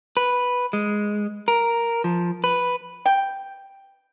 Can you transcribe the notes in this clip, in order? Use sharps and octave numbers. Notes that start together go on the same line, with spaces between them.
B4
G#3
A#4
F3
B4
G5